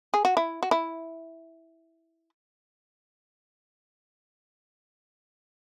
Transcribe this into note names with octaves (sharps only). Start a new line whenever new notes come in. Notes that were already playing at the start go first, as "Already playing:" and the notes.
G#4
F#4
E4
F#4
E4